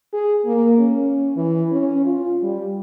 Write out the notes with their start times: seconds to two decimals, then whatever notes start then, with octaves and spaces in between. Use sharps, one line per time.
0.13 G#4
0.45 A#3
0.79 C#4
1.36 E3
1.72 C#4
2.05 F4
2.43 G3